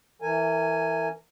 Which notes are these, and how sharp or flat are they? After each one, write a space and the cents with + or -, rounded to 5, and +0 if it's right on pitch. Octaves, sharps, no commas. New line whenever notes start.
E3 -5 A#4 -30 G#5 +0